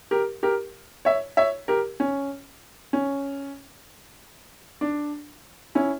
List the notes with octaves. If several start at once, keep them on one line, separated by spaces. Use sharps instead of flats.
G4 A#4
G4 A#4
C#5 E5
C#5 E5
G4 A#4
C#4
C#4
D4
C#4 E4